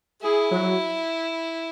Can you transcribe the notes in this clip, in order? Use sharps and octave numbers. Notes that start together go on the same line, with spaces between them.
E4 G#4
F#3